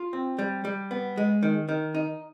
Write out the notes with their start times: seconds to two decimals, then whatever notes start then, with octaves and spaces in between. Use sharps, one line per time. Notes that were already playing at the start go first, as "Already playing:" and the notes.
Already playing: F4
0.13 C4
0.39 G3
0.65 G3
0.91 B3
1.18 G#3
1.43 D#3
1.69 D#3
1.95 D#4